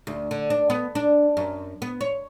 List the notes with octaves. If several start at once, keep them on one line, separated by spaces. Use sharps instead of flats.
D2
D3
D4
B3
D4
F#2
B3
C#5